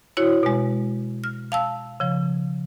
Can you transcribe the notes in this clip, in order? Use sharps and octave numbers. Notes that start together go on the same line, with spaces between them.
E4 F#4 C#5
B2 G#3
F6
F5 A5 E6
C#3 F3